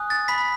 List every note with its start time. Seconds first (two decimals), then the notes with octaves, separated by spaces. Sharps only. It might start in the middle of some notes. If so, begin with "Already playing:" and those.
Already playing: G#5 D#6 F#6
0.10 A6
0.28 B5 B6